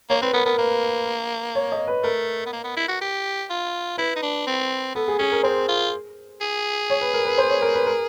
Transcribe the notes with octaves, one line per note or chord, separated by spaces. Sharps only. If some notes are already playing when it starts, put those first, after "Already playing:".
A#3 C#5
C4 B4
B3 A#4
B3 A#4
A#3 B4
C#5
D#5
B4
A3 A#4
B3
A#3
B3
E4
F#4
G4
F4
E4 B4
D#4
D4
C4
B3 A4
G#4
C#4 G#4
A#4
C4 C5
F4
G#4
C#5
B4
A#4
B4
C5
C#5
A#4
B4
A#4